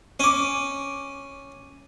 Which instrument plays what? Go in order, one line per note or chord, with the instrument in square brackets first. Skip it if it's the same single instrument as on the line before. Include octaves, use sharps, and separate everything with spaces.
[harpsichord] C#4 D6